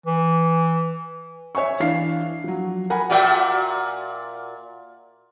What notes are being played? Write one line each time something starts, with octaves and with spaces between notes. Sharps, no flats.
E3
C#5 E5 G#5 C#6
E3 D4 F5 C7
F3 F#3
A#4 F#5 G#5 B5
A#2 F#4 E5